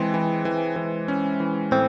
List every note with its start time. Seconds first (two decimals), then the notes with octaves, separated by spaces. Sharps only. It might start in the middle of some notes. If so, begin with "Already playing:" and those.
Already playing: E3 G#3 C4
0.14 E3
0.45 E3
0.76 E3
1.08 C#4
1.40 E3
1.72 A2 C4